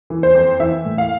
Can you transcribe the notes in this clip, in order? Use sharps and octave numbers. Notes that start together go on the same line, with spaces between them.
E3
C5
F2
E3 E5
A2
F5